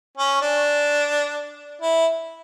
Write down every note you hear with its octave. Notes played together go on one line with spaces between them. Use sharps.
C#4
D4
E4